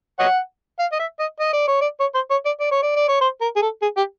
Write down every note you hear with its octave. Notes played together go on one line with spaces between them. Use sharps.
C#5 D#5 F#5
F5
D#5
E5
D#5
D#5
D5
C#5
D5
C#5
C5
C#5
D5
D5
C#5
D5
D5
C#5
C5
A#4
G#4
A4
G#4
G4